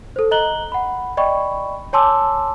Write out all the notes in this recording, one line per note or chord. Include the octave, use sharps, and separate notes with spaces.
A4 C5
D#5 A#5 F#6 F#7 G7
F#5 B5
D5 D#5 G5 B5 C#6
C#5 G#5 A5 C6 D6 E6